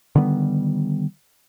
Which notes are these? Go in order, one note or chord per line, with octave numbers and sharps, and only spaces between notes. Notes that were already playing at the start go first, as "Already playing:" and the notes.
D3 D#3 G3 B3